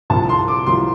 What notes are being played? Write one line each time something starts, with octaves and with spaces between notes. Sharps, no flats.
C2 C3 F3 A5
C6
D6
C2 C3 F3 C6